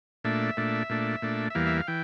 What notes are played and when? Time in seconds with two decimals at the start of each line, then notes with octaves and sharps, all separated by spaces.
0.24 A#2 A3 D4 E5
0.57 A#2 A3 D4
0.90 A#2 A3 D4
1.22 A#2 A3 D4
1.50 E5
1.55 E2 E3 G3 A#3 F5
1.67 E5
1.77 F5
1.87 E3 G5